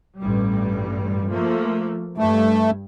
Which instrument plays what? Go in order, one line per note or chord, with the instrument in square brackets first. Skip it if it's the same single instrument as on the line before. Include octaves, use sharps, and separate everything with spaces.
[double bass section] A1 G2 G3
F3 A3 A#3
[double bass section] G2 [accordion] A3